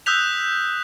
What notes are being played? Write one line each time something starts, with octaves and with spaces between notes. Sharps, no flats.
D#6 E6 F#6 G6 B6 F7